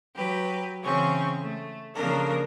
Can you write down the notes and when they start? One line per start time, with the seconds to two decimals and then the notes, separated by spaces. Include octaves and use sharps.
0.16 F#3 G4 B4
0.83 C#3 E3 C4 C#4 C#6
1.41 A3
1.95 C#3 F3 A#3 D4 A4 A#4